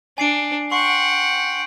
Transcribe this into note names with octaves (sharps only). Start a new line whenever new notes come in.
D4 G#5 C7 D7
F#5 G5 C6 C#6 C7